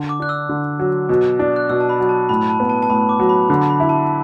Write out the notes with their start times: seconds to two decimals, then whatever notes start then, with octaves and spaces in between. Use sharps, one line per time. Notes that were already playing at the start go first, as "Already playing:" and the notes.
Already playing: D3
0.09 D6
0.20 D4 F#6
0.29 E6
0.49 D3
0.79 F#3
1.09 B2
1.39 D4
1.56 F#6
1.69 B2 E6
1.80 A5
1.89 B5
2.00 F#3
2.09 A5
2.29 A2 B5
2.50 A5
2.60 B3
2.69 A5
2.83 A5
2.89 A2 B5
3.09 D6
3.20 F#3
3.29 B5
3.50 D3
3.70 B5
3.80 E4
3.89 A5